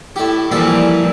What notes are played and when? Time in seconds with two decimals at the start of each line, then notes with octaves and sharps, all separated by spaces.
0.16 A2 E4 G4
0.52 A#2 E3 F3 G3 A4